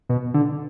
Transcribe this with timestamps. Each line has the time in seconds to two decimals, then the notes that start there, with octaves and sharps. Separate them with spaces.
0.09 B2
0.34 D3